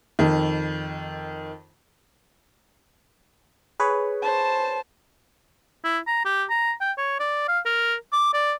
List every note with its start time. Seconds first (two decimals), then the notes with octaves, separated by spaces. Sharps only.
0.19 F2 D#3
3.80 G#4 B4 C#5
4.22 C5 A5
5.84 E4
6.07 A#5
6.25 G4
6.49 A#5
6.81 G5
6.98 C#5
7.20 D5
7.48 F5
7.65 A#4
8.12 D6
8.33 D5